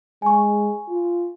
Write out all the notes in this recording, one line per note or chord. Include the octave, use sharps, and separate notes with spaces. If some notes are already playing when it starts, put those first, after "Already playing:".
G#3 G#5 C#6
F4